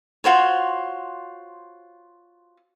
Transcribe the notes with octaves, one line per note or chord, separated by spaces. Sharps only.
F4 F#4 C5 C#5